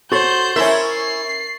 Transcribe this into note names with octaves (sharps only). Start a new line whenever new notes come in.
F#4 A4 C5 C#5 C#6 G6 A6 F#7
C#4 E4 A#4 E5
C7